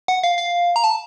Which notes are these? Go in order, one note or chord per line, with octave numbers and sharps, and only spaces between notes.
F#5
F5
F5
A#5
A5